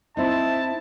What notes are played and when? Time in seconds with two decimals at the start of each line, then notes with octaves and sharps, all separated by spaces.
0.17 C4 D#4 E4 A5